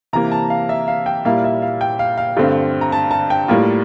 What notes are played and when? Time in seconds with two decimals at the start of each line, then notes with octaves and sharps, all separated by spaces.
0.13 C3 E3 A#3 A#5
0.32 A5
0.50 F5
0.69 E5
0.88 F5
1.06 G5
1.25 A#2 G3 A#3 E4 F5
1.44 E5
1.62 F5
1.81 G5
1.99 F5
2.18 F5
2.37 G2 D3 A3 C4
2.81 A#5
2.92 A5
3.11 A5
3.30 G5
3.48 A2 G3 A#3 F4